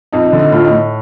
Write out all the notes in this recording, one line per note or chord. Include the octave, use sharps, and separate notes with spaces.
F2 D#4
D#4
D3
D#4
A2 F4
D#4
A2